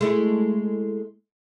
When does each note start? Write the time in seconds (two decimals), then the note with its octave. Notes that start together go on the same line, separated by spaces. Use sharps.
0.01 G#3 A3 E4